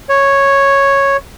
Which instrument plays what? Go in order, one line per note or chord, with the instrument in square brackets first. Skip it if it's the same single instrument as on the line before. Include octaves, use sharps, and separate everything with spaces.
[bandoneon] C#5